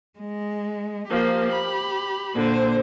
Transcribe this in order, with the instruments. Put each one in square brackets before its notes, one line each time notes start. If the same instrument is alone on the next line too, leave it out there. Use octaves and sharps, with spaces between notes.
[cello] G#3
[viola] F3 A#3 [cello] G4
[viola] B5
[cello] A#2 C5 [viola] D3